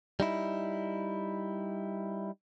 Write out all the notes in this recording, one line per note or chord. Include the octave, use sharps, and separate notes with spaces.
G3 D#4 E4